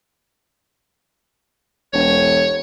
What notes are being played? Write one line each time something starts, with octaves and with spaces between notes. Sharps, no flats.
E1 C#5